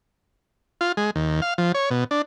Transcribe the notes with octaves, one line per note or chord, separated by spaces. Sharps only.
F4
G#3
D#2
F5
F3
C#5
B2
D4